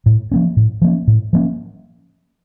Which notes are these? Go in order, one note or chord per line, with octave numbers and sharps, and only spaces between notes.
A2
F3 A#3 C#4
A2
F3 A#3 C#4
A2
F3 A#3 C#4